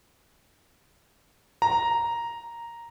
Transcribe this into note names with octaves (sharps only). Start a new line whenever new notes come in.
A#5